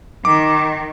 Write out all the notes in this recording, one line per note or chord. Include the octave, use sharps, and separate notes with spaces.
D#3 D6